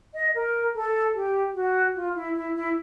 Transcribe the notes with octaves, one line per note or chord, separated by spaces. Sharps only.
D#5
A#4
A4
G4
F#4
F4
E4
E4
E4